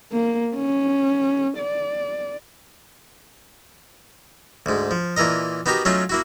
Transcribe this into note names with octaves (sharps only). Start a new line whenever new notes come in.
A#3
C#4
D5
D2 G#2
F3
A#2 E3 A4 A#4 D#5
B3 D#4 F#4 G4 A#4
F#3 A3 C#4 D#4 F4
A#3 E4 F#4